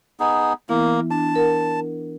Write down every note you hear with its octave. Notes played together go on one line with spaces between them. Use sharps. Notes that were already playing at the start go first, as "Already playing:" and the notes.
B3 D#4 G#4
E3 A#3 B3 E4
D4 A5
A#4 F#5